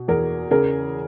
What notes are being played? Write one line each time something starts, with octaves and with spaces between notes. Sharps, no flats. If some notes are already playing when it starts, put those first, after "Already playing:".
Already playing: B2
E2 G#4 A#4
C#3 G#4 A#4